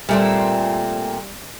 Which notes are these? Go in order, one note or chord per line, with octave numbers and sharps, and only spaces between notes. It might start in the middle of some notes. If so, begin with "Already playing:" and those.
A#2 G3 A3 C4 D5